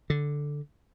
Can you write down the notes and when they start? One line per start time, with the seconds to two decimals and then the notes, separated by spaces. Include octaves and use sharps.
0.10 D3